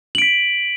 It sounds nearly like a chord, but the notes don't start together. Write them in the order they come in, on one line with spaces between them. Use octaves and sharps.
F#7 D7 B6